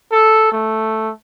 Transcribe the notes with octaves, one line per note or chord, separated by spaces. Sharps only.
A4
A3